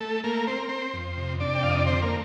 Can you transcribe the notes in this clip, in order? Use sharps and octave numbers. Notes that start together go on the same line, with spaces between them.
A3 A4
A3 A#3 A#4
C4 C5
A#4
C4 C5
F2
C3
C3 D4 D5
G5
F2 F5
D#5
D5
D3 C4 C5
A#3 A#4
A3